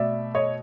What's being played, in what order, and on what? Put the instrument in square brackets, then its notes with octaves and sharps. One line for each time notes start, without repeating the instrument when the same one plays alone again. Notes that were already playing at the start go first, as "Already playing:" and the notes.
Already playing: [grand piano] B2 A3 D5 E5
C#5 D#5